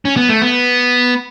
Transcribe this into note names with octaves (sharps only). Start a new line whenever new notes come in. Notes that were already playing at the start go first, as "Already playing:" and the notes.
C#4
B3
A3
B3